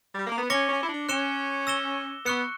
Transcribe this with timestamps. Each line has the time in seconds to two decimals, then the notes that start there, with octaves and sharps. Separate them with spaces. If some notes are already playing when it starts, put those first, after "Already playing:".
0.14 G3
0.27 A#3
0.38 B3
0.50 C#4 D6 A#6 C#7 G7
0.69 C#4
0.83 E4
0.89 D4
1.09 C#4 F#6 C#7 E7 G7
1.67 E6 A#6 E7 G7
2.25 B3 C#6 F#6 C#7